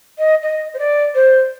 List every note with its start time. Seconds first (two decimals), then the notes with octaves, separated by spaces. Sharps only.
0.18 D#5
0.42 D#5
0.73 C5
0.78 D5
1.14 C5